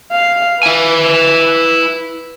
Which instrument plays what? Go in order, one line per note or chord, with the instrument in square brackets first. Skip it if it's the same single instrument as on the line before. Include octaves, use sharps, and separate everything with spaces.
[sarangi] F5
[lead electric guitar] E4 G#5 [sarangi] B4